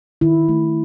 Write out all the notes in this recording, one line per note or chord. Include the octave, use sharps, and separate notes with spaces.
D#3 E4
A3